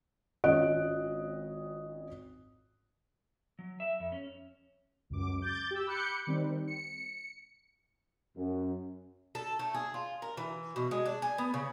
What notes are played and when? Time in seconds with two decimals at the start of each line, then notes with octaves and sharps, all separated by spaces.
0.44 G#1 C#4 F4 D#5 F#6 D7
3.59 F#3
3.80 E5
4.00 F2
4.12 C#4
5.10 C#2 F#2 D6
5.40 D6 G6 A6
5.71 G4 E6
5.87 B5 D6 F#6 G6 C#7
6.27 D#3 G3 C4
6.67 C#7
8.36 F#2
9.35 A4
9.59 A3
9.74 G#4
9.94 F4
10.22 A#4
10.37 E3
10.76 B2
10.91 G#3
11.06 D4
11.22 G#5
11.38 B3
11.54 C#3